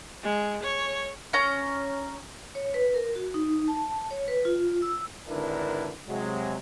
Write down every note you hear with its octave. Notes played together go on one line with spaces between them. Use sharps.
G#3
C#5
C#4 A#5
C#5
B4
A#4
F#4
D#4
A5
C#5
B4
F4
E6
G#1 D3 D4 E4 A#4 B4
C3 F#3 G#3